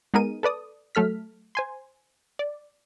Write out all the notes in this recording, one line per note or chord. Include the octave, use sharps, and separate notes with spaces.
G#3 B3 D#4 G#4 A#4 D#7
A4 B4 D5 D#6
F#3 A3 A4 F6 B6
C5 G#5 C6
D5